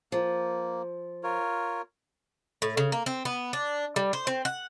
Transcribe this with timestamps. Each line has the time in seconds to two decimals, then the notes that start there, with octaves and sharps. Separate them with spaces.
0.12 F3 A#3
1.23 F4 A#4 C#5
2.62 A2
2.77 C#3
2.92 A#3
3.06 C4
3.25 B3
3.53 D4
3.96 G3
4.13 C5
4.27 C4
4.45 F#5